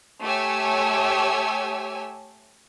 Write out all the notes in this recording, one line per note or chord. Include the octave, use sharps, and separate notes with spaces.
A3 G4 C#5 G#5 E6